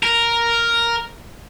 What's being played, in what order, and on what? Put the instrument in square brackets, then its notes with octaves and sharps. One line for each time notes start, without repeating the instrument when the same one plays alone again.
[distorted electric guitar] A#4